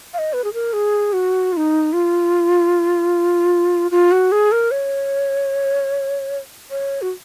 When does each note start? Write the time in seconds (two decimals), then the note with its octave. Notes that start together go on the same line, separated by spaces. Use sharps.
0.14 F5
0.18 D#5
0.33 B4
0.44 G#4
0.54 A#4
0.73 G#4
1.13 F#4
1.52 F4
1.57 D#4
1.93 F4
3.91 F4
4.12 F#4
4.32 G#4
4.52 A#4
4.71 C#5
6.71 C#5
7.02 F#4